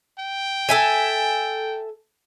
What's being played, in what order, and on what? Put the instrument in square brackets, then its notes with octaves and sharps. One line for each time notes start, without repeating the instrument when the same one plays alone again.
[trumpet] G5
[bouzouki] A4 E5 G#5